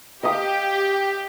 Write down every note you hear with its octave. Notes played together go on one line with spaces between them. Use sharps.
G4 D#5 F5 D#6